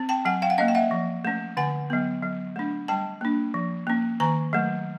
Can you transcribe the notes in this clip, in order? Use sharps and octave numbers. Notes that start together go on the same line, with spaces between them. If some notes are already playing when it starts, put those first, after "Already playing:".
Already playing: C4
G5 A5
F#3 F#5 G#5
F5 G5
F#5
A#3 C#4 D#5 F5
G5
E5 F#5
F3
A3 C#4
D3 F#5 G#5
F#3 B3
F#3
A3 D4
G3 G5 A5
A#3 D4
F3
A#3 C#4
D#3 G#5 A#5
F#3 A3